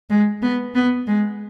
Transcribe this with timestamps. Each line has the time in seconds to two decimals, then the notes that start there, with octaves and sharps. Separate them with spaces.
0.10 G#3
0.42 B3
0.75 B3
1.07 G#3